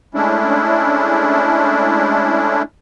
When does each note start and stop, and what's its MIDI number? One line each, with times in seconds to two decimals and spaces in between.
0.15 2.62 56
0.15 2.62 57
0.15 2.62 61
0.15 2.62 62
0.15 2.62 64